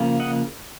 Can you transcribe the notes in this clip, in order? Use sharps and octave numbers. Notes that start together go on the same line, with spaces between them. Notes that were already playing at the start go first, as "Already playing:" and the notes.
Already playing: C#3 F3 A#3
D#5 F#5